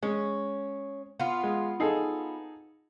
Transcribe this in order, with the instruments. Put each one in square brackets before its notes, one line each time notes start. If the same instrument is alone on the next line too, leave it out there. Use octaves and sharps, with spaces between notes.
[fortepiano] G#3 [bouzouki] C#4
[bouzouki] B3 F4
[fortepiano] G#3
D#4 G#4 A4